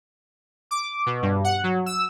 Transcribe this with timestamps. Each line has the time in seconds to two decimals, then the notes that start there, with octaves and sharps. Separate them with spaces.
0.71 D6
1.06 B2
1.22 G2
1.44 F#5
1.64 F#3
1.86 E6